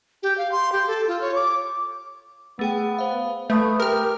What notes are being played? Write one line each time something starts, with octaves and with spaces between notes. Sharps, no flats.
G4
F5
C6
G4
A4
F4
C#5
D6
A3 B3 G#4 G5
C5 F5
A3 B4 A5 D#6 G6
G4 A#4 F6